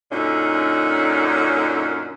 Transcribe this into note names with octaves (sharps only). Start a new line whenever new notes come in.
F#2 A#2 D3 C#4 D#4